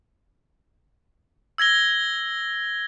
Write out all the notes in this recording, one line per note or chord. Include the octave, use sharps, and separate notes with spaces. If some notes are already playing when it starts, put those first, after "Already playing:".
E6 G#6 A#6 G7